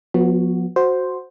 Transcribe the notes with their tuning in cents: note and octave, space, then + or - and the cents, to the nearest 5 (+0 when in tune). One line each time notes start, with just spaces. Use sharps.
F3 +35 B3 -15 F#4 +0
F#4 -5 C5 +0